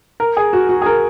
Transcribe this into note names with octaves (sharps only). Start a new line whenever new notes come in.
A#4
G#4
F#4
F#4
G#4
A#4